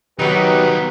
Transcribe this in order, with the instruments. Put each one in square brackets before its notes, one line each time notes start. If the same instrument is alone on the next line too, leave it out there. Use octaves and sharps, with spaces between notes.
[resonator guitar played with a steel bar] D#3 F#3 F#4 [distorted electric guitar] B3 D#4 [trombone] G4 [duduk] B4